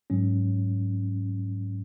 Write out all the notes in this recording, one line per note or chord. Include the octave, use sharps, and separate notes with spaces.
G#2 F#3 C#4